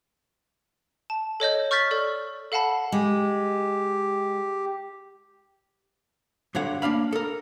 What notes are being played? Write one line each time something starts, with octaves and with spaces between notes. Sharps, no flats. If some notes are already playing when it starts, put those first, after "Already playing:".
A5
A4 C#5 D#5 G6
C#6 F6 G6 A6 B6
A4 D5
A4 F5 F#5 A5 B5
G#3 G4
G2 D3 C#5 F#5
A#3 D4 F5 B5
A4 A#4